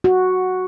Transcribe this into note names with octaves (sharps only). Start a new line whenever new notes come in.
F#4